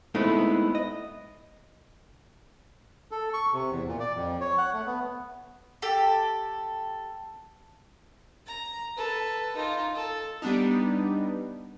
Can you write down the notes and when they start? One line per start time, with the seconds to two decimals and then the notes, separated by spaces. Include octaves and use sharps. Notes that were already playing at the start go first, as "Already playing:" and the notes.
0.15 G#3 A3 B3 C4 D#4 E4
0.75 D#5
3.11 A4
3.33 C#6
3.53 C3
3.70 E2
3.88 A#2
4.00 D5
4.16 F2
4.41 C#5
4.58 F#5
4.73 A3
4.86 B3
5.82 G4 A4
8.46 A#5
8.97 A4 B4
9.56 D#4 F4
9.95 A4
10.42 G3 B3 D4 D#4